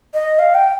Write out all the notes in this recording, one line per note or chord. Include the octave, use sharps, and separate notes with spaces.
D#5
F5
G5